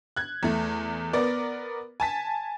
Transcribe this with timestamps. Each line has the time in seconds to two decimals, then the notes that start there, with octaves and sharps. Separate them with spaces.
0.16 F#6 G#6
0.43 E2 A3
1.13 B3 A#4 D5
2.00 G#5 A5 B6